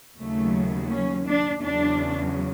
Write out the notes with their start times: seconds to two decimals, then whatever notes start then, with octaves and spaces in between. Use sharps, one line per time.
0.18 D#2 C#3 F#3 A3
0.91 C#4
1.26 D4
1.62 E2 C#3 F#3 D4